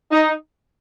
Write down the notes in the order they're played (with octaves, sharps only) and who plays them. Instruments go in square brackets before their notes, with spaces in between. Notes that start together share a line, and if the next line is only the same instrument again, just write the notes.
[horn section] D#4